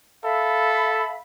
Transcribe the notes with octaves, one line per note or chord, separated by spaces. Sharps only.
A4 E5 F5 B5